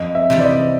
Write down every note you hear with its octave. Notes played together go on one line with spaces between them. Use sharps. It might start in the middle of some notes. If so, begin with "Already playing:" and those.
Already playing: F2 D#5
E5
C3 E3 G3
D5
D#5